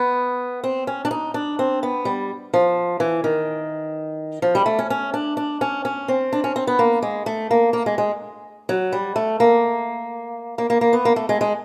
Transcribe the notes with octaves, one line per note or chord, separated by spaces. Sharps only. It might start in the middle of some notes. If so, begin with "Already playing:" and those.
Already playing: B3
C4
C#4
D4
D#4
D4
C4
B3
G3
F3
E3
D#3
F3
G3
A3
C#4
C#4
D4
D4
C#4
C#4
C4
D4
C#4
C4
B3
A#3
G#3
A3
A#3
A#3
G#3
G#3
F#3
G3
A3
A#3
A#3
A#3
A#3
B3
A#3
A3
G#3
G#3